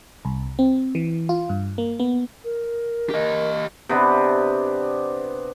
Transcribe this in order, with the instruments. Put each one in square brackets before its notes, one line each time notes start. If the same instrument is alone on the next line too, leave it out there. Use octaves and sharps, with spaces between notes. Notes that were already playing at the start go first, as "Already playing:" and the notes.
[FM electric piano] C2
C4
E3
F4
G2
A#3
B3
[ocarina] A#4
[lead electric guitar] G4 D#5
[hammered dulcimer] C3 B3 D4